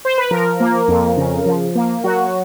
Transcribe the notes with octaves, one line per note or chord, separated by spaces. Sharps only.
C5
B4
F3 A#4
A#3
F2
C#3
F3
A#3
F#3 F#4